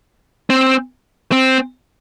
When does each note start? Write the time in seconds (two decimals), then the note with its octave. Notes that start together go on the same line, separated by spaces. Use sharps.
0.50 C4
1.32 C4